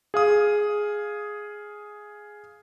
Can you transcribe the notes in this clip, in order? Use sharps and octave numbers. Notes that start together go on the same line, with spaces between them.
G#4 F5 D#6